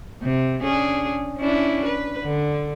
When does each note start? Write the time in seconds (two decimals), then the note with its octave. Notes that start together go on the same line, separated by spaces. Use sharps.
0.23 C3
0.62 C#4 D4 G#4
1.38 C#4 D4 E4
1.85 B4
2.24 D3